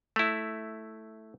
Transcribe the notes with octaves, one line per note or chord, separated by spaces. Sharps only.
A3 E4